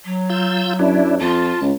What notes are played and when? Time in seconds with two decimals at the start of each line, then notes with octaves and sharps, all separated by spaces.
0.04 F#3
0.30 F4 E6 G6
0.79 F#2 D4 E4
1.20 F2 F4 A5
1.61 C#2